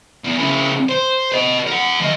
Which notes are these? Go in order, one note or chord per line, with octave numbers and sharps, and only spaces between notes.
E2
C#3 E4
C5
B4 D#5
A#4 F#5
D#2 D#5